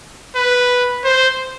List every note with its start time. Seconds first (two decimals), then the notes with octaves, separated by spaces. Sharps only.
0.36 B4
1.05 C5